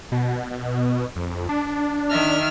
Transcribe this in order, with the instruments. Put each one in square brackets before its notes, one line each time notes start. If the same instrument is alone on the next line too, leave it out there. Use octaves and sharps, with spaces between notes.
[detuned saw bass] B2
F2
D4
[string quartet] D#3 E5 F6